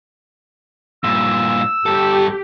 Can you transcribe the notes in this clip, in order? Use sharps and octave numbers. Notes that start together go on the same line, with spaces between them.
G2 A#2 E6
G2 G4 A4